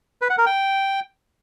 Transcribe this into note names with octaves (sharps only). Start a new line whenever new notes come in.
B4
F#5
A#4
G5